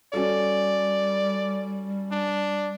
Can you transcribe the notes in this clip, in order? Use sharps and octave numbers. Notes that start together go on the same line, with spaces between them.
G3 C#4 F#4 A4 D5
D4